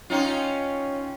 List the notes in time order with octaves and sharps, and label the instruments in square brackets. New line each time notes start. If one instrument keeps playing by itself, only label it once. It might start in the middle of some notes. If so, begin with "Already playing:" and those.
[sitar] C#4 D#4 F4 [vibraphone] C#5 G5